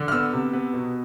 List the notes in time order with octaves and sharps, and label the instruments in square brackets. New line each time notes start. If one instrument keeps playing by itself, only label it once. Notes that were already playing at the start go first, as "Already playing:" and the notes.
Already playing: [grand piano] D3
F6
B3 E6
C3
B3
B2